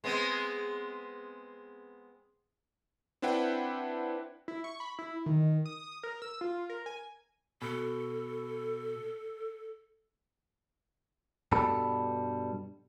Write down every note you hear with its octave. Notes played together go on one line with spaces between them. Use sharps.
G#3 B3 C4
C4 D4 E4 B4 F#5 G5
E4
C#6
B5
E4
D#3
D#6
A#4
E6
F4
A#4
G#5
B2 A4
G2 B2 G3 A4 B5